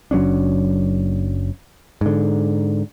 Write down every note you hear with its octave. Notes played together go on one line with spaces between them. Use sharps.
F#1 F#3 C#4 D4
G#2 D3